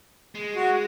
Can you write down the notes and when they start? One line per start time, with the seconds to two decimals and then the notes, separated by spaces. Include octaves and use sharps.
0.35 G#3
0.56 F#4